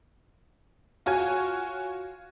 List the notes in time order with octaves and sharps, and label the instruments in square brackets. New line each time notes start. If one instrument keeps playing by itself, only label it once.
[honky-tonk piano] F4 F#4 C#5 G#5 F6